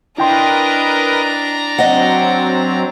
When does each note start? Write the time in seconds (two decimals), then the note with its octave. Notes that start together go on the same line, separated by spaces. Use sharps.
0.18 D4 E4 A#4 B4 D#5 G5 A#5 C6
1.78 F#3 C4 D#5 F#5